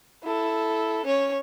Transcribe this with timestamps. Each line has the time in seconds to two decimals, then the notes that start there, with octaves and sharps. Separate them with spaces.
0.24 E4 A4
1.05 C#4 C#5